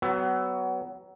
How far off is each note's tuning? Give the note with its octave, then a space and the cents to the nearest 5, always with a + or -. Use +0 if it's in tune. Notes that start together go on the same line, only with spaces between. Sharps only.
F#3 +30 B3 +20